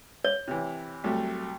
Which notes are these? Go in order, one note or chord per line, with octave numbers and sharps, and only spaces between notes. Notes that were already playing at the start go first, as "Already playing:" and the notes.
C#5
C3 E3
C2 F#3 A3